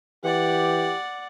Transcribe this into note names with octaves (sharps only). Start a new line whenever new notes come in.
E3 G4 D5 F#5